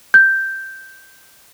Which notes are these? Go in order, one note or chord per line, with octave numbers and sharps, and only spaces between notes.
G6